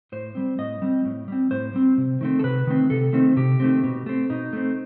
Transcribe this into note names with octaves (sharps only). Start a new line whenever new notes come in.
A2 C5
G3 C4
A2 D#5
G3 C4
A2
G3 C4
A2 C5
G3 C4
C3
D#3 A3 C4
A4
C3 B4
D#3 A3 C4
C3 A4
D#3 A3 C4
C3 G4
D#3 A3 C4
B2
A3 C4
B2 D#4
A3 C4